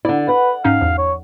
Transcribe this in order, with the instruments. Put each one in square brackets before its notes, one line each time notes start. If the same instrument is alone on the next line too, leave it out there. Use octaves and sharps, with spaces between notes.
[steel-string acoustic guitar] D3 D5 [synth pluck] E4
[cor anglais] B4 [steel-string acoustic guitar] F#5
[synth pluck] G#2 C#4 D#4 [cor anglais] F5
[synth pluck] E2 F3
[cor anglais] C#5